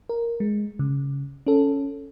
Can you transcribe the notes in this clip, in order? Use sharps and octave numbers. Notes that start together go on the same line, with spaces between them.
A#4
G#3
C#3
C#4 A4